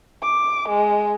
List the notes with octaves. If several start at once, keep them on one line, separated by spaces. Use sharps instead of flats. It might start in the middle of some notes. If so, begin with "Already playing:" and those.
D6
G#3